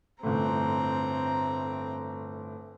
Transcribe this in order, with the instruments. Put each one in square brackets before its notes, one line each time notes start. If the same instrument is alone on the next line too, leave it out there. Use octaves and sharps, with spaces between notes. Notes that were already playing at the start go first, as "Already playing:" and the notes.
[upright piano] G1 A2 [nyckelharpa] C4 A#5